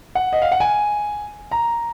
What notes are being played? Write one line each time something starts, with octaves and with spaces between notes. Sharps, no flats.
F#5
D#5
F5
F#5
G#5
A#5